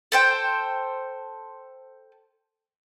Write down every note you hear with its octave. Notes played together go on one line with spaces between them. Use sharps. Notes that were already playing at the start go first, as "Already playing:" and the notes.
A4 C5 G5